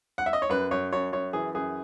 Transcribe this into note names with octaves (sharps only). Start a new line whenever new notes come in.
F#5
E5
D#5
C#5
F#2 B4
F#2 C#5
F#2 C#5
F#2 C#5
E3 G#4
F#2 G#4